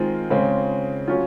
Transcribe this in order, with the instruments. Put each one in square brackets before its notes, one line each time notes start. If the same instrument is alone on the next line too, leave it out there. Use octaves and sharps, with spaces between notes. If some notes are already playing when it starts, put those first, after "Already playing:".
Already playing: [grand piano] D#3 G#3 C4 F4
C#3 G#3 C4
F#3 C#4 F4